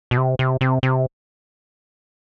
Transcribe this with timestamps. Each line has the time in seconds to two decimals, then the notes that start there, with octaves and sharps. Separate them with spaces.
0.11 B2
0.17 C3
0.39 C3
0.61 C3
0.83 C3